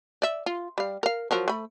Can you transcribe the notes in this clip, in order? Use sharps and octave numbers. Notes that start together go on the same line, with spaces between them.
D5 E5
F4
G3 F5
A#4 F5
F3 F#3 A#4
A3 B5